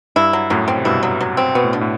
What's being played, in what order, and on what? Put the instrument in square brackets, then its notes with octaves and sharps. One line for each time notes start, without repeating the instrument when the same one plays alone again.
[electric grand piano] G2 [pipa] E4
[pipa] F#3
[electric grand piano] F#2 A2 [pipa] F#3
[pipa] C4
[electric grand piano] C3
[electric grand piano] G2 B2 [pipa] E4
[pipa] F#3
F#3
C4
[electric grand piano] B2 [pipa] B3
[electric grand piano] A2
[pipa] D3
[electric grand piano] A2